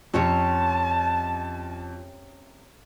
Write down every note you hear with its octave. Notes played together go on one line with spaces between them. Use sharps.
F2 C3 C#4 C#5 A5